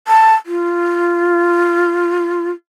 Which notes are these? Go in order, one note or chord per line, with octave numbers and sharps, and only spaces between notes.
A5
F4